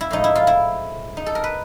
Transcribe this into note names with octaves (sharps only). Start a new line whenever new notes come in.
E4
A2 F3 G#3 D#4
E4
F4
E4
D#4
A4
A#4
B4